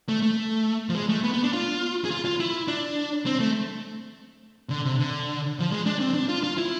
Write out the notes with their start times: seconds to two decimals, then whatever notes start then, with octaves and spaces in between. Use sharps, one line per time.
0.09 A3
0.22 A3
0.89 F3
0.95 G#3
1.09 A3
1.23 B3
1.34 B3
1.43 D4
1.53 F4
2.05 G#4
2.11 F4
2.25 F4
2.40 E4
2.68 D4
3.26 C4
3.40 A3
4.70 D3
4.85 C3
4.99 D3
5.60 F3
5.71 G#3
5.86 D4
6.00 C4
6.14 D4
6.29 F4
6.44 F4
6.58 E4